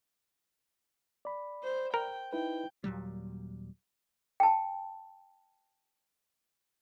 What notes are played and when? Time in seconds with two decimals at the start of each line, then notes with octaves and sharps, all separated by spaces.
1.25 D5 B5
1.63 C5
1.94 A#4 G5
2.33 D#4 E4 B4 G5
2.84 D#2 A#2 F#3 G3
4.40 G5 A5